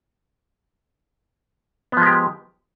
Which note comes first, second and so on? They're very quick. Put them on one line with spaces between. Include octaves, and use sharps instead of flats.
B3 F3 G#3 G4